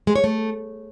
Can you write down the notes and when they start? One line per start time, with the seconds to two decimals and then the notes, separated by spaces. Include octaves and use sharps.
0.07 G#3
0.15 C#5
0.24 A3